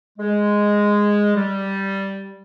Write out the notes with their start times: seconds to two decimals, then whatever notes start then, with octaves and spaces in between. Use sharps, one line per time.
0.19 G#3
1.36 G3